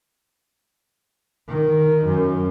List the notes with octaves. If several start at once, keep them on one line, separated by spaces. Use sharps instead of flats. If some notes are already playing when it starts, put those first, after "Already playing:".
D#3
F#2